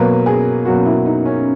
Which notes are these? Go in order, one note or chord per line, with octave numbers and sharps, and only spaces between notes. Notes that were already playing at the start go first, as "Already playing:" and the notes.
Already playing: B2 F#3 A#3 B4
G#4
B2 F#3 A#3 F#4
E4
D#4
C#4